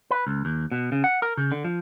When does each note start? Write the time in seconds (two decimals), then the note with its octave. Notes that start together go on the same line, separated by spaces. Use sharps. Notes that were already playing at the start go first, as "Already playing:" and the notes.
0.11 B4
0.27 C#2
0.45 D#2
0.72 B2
0.92 C#3
1.04 F#5
1.22 A#4
1.37 C#3
1.52 D3
1.65 F3